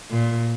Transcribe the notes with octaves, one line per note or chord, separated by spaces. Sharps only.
A#2